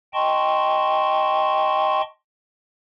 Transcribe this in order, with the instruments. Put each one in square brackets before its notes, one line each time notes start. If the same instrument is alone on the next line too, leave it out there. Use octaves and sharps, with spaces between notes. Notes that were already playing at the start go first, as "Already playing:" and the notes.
[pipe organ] D#5 G5 A5 C6 C#6